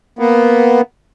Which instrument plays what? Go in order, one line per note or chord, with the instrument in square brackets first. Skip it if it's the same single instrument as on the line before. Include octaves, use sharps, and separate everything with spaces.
[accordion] A#3 B3